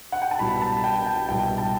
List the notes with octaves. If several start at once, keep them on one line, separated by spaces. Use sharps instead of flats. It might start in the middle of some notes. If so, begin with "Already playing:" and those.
F#5
G5
A5
C2 B2 G3 B5
A5
G5
G5
C2 B2 G3 G5
A5